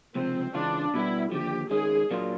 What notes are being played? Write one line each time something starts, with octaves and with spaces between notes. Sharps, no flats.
C#2 C3 F3 C4
C#3 E3 G#3 C#4 D4 F4
B2 G3 B3 E4
D#2 D3 F3 G4
D#3 G#3 C#4 G#4
A#2 F#3 A#3 D4 F4